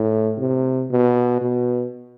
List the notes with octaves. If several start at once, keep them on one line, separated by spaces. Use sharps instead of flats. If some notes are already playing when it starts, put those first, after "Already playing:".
Already playing: A2
C3
B2
B2